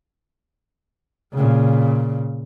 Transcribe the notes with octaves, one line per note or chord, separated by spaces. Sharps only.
A#2 C#3